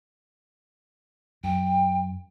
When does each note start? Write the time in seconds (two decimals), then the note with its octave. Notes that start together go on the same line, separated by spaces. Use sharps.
1.44 F#2 G5